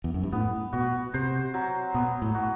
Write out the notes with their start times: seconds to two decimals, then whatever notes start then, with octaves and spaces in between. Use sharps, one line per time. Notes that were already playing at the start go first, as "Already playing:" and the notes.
0.04 E2
0.14 F#2
0.23 G2
0.32 A2 B3
0.73 B2 F#4
1.14 C3 C5
1.54 F#3
1.94 B2 B3
2.22 A2
2.35 F#4